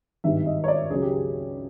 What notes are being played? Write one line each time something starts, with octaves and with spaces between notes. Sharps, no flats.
G#1 G2 D#3 G3 E5
D#5
C#5
D5
C#2 C#3 F#3 G#4
G4
G#4